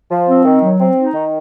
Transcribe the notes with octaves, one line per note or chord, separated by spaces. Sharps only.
F3
C4
D#3
F#3
C4
D#4
D#3